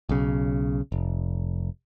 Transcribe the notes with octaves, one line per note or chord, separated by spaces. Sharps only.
B1 C#3
F1